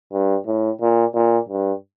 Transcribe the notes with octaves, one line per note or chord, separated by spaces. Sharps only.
G2
A2
A#2
A#2
G2